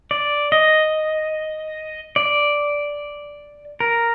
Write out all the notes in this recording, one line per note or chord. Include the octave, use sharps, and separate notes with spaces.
D5
D#5
D5
A#4